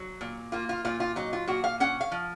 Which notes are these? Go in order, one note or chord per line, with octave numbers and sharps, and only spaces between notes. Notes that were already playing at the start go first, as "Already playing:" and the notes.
Already playing: F#3
A#2
A#3 F4
F4
A#2 F4
F4
F#3 D#4
F4
A#2 F#4
F5
C#4 F#5
F5
F3